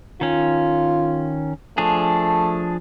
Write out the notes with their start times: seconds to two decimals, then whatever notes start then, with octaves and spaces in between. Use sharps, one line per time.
0.21 D#3 C#4 F4
1.78 F3 A3 D4 G#4